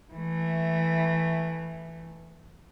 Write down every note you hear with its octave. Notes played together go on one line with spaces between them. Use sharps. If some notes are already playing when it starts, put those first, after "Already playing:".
E3 A3